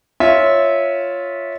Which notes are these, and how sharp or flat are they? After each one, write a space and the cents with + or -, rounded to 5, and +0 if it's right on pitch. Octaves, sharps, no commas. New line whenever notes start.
F4 +0 C#5 +0 E5 -15